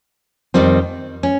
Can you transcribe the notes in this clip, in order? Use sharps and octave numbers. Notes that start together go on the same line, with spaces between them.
F2 D#3 G3 C4
C#4